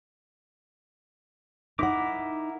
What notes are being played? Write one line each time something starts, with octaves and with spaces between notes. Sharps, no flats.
D#4 E4 A#4 F#5 D6